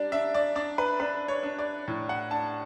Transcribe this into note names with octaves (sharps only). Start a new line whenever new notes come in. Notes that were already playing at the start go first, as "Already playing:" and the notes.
Already playing: G3 D4 D5
D4 E5
D5
D4 D5
B4
D4 B4
C#5
D4
D5
A2
F#5
D4 A5